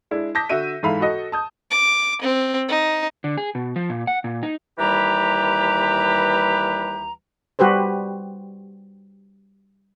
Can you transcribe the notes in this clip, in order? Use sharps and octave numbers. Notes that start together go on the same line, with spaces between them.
G#3 D4 E4
A5 D6 D#6 G6 A#6 B6
D3 F#4 E5 D#7
G#2 E3 A4 E5 F5 B5
F#4 A4 D#5
A5 D#6 G6
D6
C4
D#4
D3
G#4
B2
F3
A#2
F#5
A#2
D#4
D#2 E3 G3 G4 B4 A#5
G3 F#4 G4 B4 C5